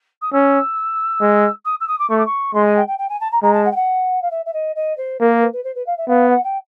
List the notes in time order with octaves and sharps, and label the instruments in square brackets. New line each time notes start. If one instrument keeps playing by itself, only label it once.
[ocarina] D#6
[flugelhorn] C#4 [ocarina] E6
[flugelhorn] G#3
[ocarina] D#6
E6
D#6
D6
[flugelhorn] A3 [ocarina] C#6
[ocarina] D6
C#6
[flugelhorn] G#3 [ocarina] C6
[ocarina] G#5
G5
G5
G5
G#5
A5
A#5
[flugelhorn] G#3 [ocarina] A#5
[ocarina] A5
F#5
G5
F#5
F5
E5
E5
D#5
D#5
C5
[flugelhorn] A#3 [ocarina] A#4
[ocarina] A#4
B4
B4
C5
B4
F5
E5
[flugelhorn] B3 [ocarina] F5
[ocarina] F#5
G5